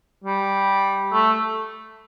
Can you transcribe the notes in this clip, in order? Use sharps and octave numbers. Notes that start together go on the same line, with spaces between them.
G3
A3